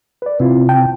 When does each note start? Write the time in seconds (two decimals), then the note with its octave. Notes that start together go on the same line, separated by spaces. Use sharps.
0.22 B4 D5
0.40 C3 C4 E4 F4
0.69 G5 A5